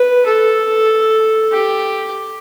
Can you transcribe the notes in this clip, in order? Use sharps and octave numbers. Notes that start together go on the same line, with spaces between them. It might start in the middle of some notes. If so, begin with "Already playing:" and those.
Already playing: B4
A4
G4